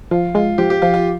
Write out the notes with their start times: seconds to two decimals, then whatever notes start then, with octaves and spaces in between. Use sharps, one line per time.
0.11 F3 F4
0.35 G#3 F4
0.58 F3 G4
0.70 G4
0.82 F3 F4
0.94 F4